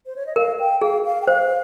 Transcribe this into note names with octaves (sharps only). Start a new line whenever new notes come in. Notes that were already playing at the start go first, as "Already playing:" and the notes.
C5
C#5
D#5
A#4 F5
G5
G#4 F5
F5
G5
C5 F5